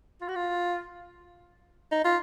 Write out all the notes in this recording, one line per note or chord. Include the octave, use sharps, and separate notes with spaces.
F4
F#4
F4
D#4
F4